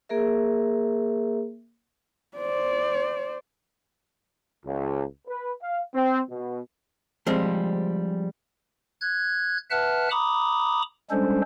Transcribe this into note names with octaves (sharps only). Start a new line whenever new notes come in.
A#3 G#4 A#4 E5
C5 D5
C#2
B4
F5
C4
B2
F3 G3 G#3 C4
F#6 G#6
B4 E5 F#5 A5 F6 F#6
A#5 B5 D6 D#6
G3 G#3 C#4 D4 A4 C5